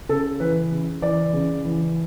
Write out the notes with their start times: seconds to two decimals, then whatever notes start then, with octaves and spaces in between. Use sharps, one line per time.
0.09 C#3 A4
0.40 E3 B4
0.72 C#3
1.02 E3 D5
1.33 C#3
1.65 E3